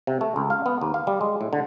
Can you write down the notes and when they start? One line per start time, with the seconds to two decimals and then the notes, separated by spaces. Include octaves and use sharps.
0.07 C3
0.21 A3
0.36 C#2
0.50 F5
0.66 B3
0.81 D#2
0.94 F5
1.07 G3
1.21 G#3
1.41 A2
1.53 D3